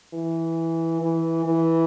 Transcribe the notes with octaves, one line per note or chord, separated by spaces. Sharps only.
E3
E3
E3